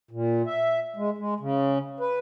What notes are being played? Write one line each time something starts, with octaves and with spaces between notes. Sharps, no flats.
A#2
E5
G#3
G#3
C#3
B4